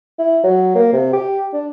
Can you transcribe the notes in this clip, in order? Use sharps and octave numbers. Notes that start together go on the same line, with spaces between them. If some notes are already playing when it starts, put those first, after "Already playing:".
E4
F#3
A#3
C3
G4
D4